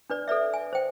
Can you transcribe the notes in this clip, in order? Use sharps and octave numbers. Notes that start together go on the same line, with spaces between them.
D4 B4 D5
A4 B4 D5 E5
G#5
C5 G5